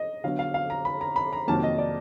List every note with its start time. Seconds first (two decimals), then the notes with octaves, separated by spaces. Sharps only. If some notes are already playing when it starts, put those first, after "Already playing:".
Already playing: D#5
0.24 D3 F#3 B3 F5
0.39 F5
0.54 F5
0.70 A#5
0.85 B5
1.01 A#5
1.16 B5
1.33 A#5
1.48 F2 C3 D#3 F#3 A#3 A5
1.63 D#5
1.78 D5